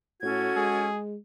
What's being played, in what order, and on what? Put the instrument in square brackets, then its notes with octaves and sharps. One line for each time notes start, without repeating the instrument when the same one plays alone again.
[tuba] A2 [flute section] C#4 A4 G#6 [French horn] F#4
[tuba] G#3 [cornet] G#4